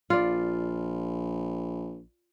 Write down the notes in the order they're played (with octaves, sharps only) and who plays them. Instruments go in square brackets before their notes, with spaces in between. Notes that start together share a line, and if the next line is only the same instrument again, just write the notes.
[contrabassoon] A#1 [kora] F4 D5